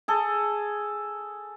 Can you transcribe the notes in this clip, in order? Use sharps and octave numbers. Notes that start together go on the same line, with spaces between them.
G#4 A4